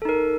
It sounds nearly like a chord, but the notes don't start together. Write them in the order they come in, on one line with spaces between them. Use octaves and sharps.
A4 D#4 A#4